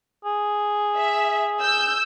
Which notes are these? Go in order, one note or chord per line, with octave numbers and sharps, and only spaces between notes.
G#4
E5
E6 G6